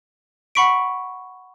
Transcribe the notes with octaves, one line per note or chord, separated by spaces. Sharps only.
F#5 B5 C#6 B6 D7